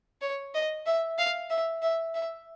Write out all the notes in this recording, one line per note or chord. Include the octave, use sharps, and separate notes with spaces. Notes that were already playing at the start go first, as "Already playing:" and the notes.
C#5
D#5
E5
F5
E5
E5
E5